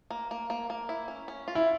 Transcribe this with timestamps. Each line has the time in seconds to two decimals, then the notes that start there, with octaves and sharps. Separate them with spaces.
0.10 A#3
0.31 A#3
0.50 A#3
0.70 A#3
0.89 E4
1.08 C#4
1.28 C#4
1.48 F4
1.55 E4